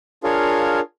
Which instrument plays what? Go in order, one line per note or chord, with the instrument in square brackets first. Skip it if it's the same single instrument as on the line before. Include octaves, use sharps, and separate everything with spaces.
[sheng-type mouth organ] D4 F4 G#4 A#4 C#5 F5